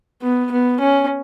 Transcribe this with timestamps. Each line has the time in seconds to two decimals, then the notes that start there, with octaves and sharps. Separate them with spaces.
0.22 B3
0.51 B3
0.80 C#4